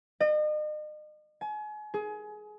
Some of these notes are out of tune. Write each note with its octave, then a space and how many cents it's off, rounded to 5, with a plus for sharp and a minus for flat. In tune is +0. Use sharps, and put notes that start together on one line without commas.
D#5 -40
G#5 +35
G#4 +25